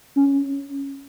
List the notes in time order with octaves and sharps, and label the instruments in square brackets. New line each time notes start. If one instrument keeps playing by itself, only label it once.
[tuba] C#4